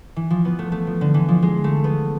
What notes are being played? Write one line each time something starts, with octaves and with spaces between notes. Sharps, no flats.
E3
F3
B3
A3
A3
F3
D3
E3
F3
G#3
A3
B3